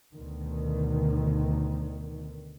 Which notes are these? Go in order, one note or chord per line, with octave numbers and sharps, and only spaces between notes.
D2 B2 D3 D#3